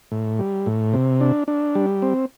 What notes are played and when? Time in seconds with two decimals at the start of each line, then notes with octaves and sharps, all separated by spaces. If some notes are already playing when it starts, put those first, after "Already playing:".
0.11 A2
0.39 G3
0.66 A2
0.93 C3
1.21 D4
1.48 D4
1.75 G3
2.02 C4